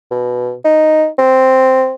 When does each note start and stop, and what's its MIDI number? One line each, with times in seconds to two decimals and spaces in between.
0.11 0.54 47
0.65 1.07 63
1.19 1.94 60